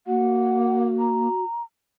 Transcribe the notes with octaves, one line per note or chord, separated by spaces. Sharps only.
A#3 F#4 F#5
A#5